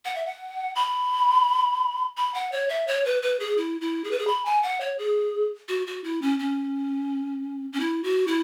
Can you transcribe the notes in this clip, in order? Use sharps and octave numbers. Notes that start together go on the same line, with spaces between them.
F#5
E5
F#5
B5
B5
F#5
C#5
E5
C#5
B4
B4
G#4
E4
E4
G#4
B4
G#4
B5
G#5
F#5
C#5
G#4
F#4
F#4
E4
C#4
C#4
C#4
E4
F#4
E4